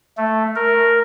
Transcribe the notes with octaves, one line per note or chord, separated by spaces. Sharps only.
A3
A#4